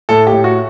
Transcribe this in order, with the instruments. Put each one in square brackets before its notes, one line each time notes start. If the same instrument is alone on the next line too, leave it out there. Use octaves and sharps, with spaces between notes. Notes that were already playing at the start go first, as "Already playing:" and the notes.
[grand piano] A2 A4
G4
A2
F#4